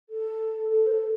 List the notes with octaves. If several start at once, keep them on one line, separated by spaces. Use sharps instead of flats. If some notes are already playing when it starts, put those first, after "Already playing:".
A4
A4
C5
A4